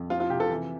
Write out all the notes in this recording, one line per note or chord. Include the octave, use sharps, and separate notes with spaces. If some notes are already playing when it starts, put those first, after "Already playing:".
Already playing: F2
F3 F4
F4
C3 G4
A4
E3